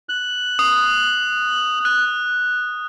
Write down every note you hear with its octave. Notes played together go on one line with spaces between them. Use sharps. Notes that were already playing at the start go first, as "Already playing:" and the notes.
F#6
D#6
F#6